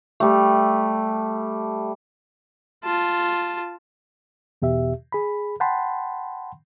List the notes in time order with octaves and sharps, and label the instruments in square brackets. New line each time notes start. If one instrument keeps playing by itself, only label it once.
[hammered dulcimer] G3 A3
[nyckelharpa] F4 A5
[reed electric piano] E2 B2 G4 E5
G#4 B5
F#5 G5 A5 B5 C6